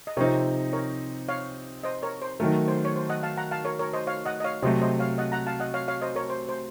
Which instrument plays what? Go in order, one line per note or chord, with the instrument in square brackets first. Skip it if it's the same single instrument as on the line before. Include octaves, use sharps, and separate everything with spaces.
[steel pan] D#5
[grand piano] C3 F3 C4 D#4 [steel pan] A#4 C#5
[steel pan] A#4 C#5
C#5 F5
C5 D#5
A#4 C#5
C5
[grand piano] D#3 F#3 A3 [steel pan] A#4
[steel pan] C5
C#5
C5
D#5 F#5
F5 A5
F#5 A#5
F5 A5
A#4 C#5
A#4 C#5
C5 D#5
C#5 F5
D#5 F#5
D#5
C#5 F5
[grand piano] C3 F#3 A3 [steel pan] C5 D#5
[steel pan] C5 D#5
C#5 F5
D#5 F#5
F#5 A#5
F5 A5
D#5 F#5
C#5 F5
C#5 F5
C5 D#5
A#4 C#5
C5
C5